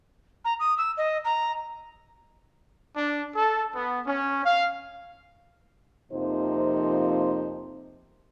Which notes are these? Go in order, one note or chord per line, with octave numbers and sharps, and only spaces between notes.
A#5
D#6
E6
D#5
A#5
D4
A4
B3
C#4
F5
F2 C3 F3 A#3 D#4 C5